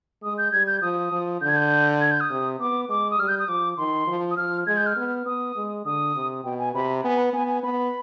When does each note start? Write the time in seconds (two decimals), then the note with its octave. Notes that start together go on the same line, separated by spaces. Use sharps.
0.22 G#3 D#6
0.38 G6
0.53 G3 G#6
0.67 G6
0.82 F3 D#6
1.12 F3
1.42 D3 G6
1.49 G#6
1.56 G6
2.01 G#6
2.11 G6
2.20 D#6
2.30 C3
2.60 B3 D6
2.89 G#3 D6
3.11 D#6
3.19 G3 F6
3.28 G6
3.39 D#6
3.48 F3 D6
3.78 D#3 C6
4.07 F3
4.31 D#6
4.37 F3 F6
4.67 G#3 G#6
4.77 G6
4.86 F6
4.97 B3
5.26 B3 D#6
5.56 G#3
5.85 D3 D#6
6.15 C3
6.44 B2 G5
6.59 G#5
6.74 C3 B5
7.04 B3 G#5
7.18 B5
7.33 B3 G#5
7.48 G#5
7.63 B3 B5